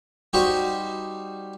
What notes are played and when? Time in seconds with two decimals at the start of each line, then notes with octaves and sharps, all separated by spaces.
0.33 G3 D#4 F#4 G4 C5